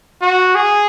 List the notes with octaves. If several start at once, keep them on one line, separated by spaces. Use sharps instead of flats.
F#4
G#4